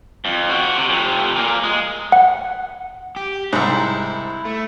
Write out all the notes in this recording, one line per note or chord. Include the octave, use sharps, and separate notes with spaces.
F2
C4 F#4
C3
F2 C3
A#2 A#3
G#3
F#5
G4
C2 G#2 E4
A3